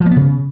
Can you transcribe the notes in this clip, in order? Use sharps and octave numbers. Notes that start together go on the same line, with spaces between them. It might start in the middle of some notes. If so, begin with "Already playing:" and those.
F3
A#3
B3
C#3